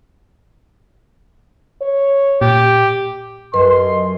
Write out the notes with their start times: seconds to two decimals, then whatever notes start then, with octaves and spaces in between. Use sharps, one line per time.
1.82 C#5
2.41 A#2 G4
3.54 F#2 G4 A4 B4 D#5 C6